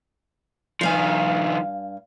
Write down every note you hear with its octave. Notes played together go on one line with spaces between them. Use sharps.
G2 D#3 F3 F5 G#5